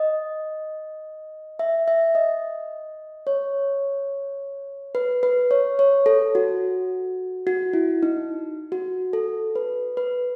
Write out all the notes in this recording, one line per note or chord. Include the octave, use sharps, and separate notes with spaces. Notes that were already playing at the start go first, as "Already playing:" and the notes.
Already playing: D#5
E5
E5
D#5
C#5
B4
B4
C#5
C#5
A4
F#4
F#4
E4
D#4
F#4
A4
B4
B4